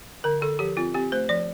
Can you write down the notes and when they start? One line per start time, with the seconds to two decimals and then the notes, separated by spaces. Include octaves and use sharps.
0.24 D3 A#4
0.41 D3 A4
0.59 F3 G4
0.77 C4 F4
0.94 C4 G4
1.12 A3 C5
1.29 F3 D5